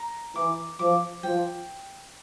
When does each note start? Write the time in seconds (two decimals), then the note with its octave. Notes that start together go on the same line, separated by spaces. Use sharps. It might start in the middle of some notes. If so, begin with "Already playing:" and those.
Already playing: A#5
0.35 E3 D6
0.79 F3 D6
1.23 F3 G5